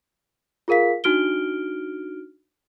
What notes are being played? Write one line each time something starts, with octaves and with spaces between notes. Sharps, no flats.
F4 G#4 A#4 F5 B6
D4 D#4 F#4 F6 D7 G7